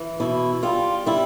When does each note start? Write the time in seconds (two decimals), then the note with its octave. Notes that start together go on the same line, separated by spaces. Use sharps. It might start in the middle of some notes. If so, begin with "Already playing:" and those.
Already playing: E3
0.20 B2 E4
0.63 G3 F4
1.06 G3 E4